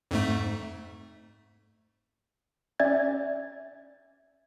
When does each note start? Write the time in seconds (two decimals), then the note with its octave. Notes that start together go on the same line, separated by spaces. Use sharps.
0.11 F2 G#2 A3
2.79 C#4 D5 E5 G#6 A6